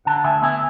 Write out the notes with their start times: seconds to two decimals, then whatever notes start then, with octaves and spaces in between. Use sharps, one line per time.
0.05 D3 F#5 A5
0.24 D2 E5 G#5
0.42 B3 E5 G#5